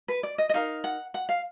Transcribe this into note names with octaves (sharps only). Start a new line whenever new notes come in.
B4
D5
D#5
D#5
D#4 A#4 F5
F#5
F#5
F5